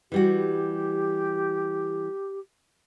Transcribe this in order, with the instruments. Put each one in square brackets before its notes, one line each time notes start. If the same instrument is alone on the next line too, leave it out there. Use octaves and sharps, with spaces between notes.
[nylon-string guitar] E3 G3 F#4 [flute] G4